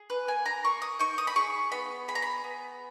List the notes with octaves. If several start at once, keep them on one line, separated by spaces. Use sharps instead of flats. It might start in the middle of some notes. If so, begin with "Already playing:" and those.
Already playing: G#4
B4
A#3 G#5
A#5
A#3 C#6
D#6
D#4 C#6
D#6
B5
G#4 C#6
B3 B5
G#4 B5
A#5
B5
B3